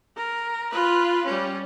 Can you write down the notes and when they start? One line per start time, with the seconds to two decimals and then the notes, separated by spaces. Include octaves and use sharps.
0.16 A#4
0.72 F4 B4
1.25 G3 C#4